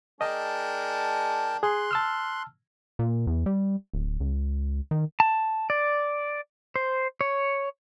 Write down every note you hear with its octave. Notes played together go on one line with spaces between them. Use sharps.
G#3 D4 A#4 D#5 G5 A5
G#4 C6 F#6
A5 E6 F6
A#2
E2
G3
D1
C#2
D#3
A5
D5
C5
C#5